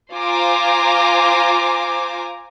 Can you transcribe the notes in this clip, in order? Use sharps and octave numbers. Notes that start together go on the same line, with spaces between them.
F4 C5 G#5 A#5 D6